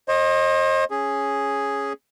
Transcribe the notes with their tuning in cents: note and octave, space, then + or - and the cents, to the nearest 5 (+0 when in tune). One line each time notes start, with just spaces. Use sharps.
C5 +40 D#5 +0
C#4 +0 G#4 +0